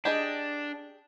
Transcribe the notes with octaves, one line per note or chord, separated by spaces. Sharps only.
D4 G4 G#4 D#5